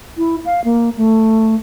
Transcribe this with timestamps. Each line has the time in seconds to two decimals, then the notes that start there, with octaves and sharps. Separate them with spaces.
0.18 E4
0.46 F5
0.65 A#3
0.97 A3